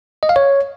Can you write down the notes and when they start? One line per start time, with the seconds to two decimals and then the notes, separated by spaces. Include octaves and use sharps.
0.23 D#5
0.29 F5
0.36 C#5